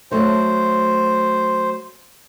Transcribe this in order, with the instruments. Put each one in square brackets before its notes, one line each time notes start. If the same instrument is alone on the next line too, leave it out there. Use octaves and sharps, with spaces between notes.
[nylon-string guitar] F#3 A3 [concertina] C5